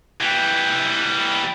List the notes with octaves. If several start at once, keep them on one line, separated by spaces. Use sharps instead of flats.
E3 G3